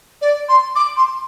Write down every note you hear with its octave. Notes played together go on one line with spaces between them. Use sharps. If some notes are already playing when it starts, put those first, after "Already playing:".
D5
C6
D6
C6